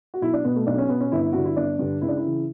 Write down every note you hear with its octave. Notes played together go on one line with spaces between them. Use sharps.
F#4
B1 E4
D4
B2 B3
A3
B1 D4
C#4
B2 B3
C#4
G1 E4
G2 D3 F#4
E4
G1 D4
G2 D3
C#2 E4
D4
E4
C#3 E3